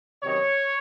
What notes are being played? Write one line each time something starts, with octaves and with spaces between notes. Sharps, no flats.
C3 D#3 F#3 C#4 C#5